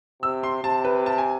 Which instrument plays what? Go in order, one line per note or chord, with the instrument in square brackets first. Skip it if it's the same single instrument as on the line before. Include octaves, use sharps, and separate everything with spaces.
[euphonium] C3 [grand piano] E6
[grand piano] C6
[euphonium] C3 [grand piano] A5
[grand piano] B4
A5
G#5